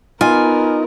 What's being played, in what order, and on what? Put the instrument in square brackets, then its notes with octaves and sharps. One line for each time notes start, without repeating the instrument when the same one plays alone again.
[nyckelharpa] B3 A#4 [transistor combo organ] D#4 [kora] F4 [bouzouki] G#5